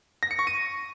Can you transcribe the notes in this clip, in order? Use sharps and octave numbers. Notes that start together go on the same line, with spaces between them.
A#6
C#7
C#6
D#7